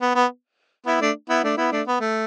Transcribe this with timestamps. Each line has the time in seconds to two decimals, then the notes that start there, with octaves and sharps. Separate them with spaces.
0.02 B3
0.16 B3
0.86 B3 E4
1.01 A3 D4
1.29 B3 E4
1.44 A3 D4
1.58 B3 E4
1.72 A3 D4
1.87 B3
2.01 A3